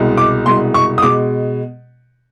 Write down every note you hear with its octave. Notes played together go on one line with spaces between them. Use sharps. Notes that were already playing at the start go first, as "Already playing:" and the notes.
Already playing: C2 B2 G#3
D6
C2 B2 G#3 C6
C#6
D#6
B2 G#3 D6